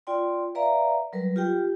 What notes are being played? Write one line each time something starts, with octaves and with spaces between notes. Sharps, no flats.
F4 D5 G5 C6
B4 D5 E5 F5 A#5
F#3 G3 A#4 B4
F4 G4 G5